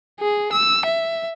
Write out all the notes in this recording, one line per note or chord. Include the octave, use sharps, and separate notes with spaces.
G#4
E6
E5